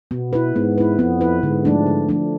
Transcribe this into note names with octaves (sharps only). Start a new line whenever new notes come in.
B2 B3
E4 B4
G#2 B3
E4 B4
F2 B3
E4 B4
G#2 D3
F3 A3 D4
D3
F3 A3 D4